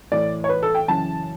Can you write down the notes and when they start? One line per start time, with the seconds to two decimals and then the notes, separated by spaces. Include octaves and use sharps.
0.12 A2 E3 D5
0.44 C#5
0.49 B4
0.63 A4
0.75 G5
0.88 F#2 C#3 E3 A5